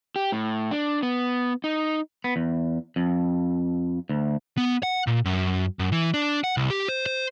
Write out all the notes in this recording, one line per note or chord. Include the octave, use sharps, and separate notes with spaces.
G4
A2
D4
B3
D#4
B3
E2
F2
D2
B3
F#5
A#2
F#2
F#2
E3
D4
F#5
C2
G4
C5
C5